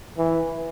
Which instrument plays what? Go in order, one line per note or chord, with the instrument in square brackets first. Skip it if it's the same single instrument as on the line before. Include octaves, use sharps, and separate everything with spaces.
[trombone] E3